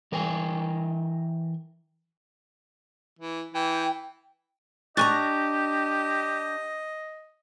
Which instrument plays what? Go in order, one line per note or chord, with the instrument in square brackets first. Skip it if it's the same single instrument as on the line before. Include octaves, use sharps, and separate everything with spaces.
[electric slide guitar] E3 A#4 G5 G#5
[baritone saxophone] E3
[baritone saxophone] E3 [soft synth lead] G5
[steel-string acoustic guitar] D4 G#5 A#5 [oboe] G4 [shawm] D#5 [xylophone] C#6 F#6 A6